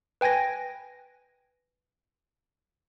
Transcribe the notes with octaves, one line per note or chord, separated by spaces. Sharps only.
B4 G5 G#5 G#6 A#6